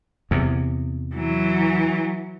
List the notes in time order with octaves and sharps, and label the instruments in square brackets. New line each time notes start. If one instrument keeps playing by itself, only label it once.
[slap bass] E2 C3
[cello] E3 F#3